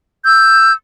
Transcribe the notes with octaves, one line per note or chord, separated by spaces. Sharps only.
E6 G6